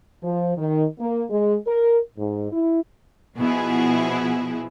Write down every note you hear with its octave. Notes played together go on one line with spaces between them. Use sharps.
F3
D#3
A#3
G#3
A#4
G#2
E4
B2 F3 B3 E4 G#4